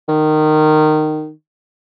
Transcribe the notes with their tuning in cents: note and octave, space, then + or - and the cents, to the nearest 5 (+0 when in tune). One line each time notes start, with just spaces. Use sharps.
D#3 -15